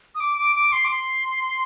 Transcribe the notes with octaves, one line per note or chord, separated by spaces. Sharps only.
D#6
D6
D6
D6
C6
D6
C6